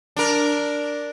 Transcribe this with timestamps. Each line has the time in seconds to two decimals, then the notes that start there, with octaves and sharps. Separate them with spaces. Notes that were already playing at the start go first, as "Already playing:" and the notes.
0.17 D4 A#4